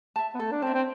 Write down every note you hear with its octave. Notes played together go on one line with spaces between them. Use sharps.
E5 A5
B3
A3 A4
D4
C4 E5 A5
C4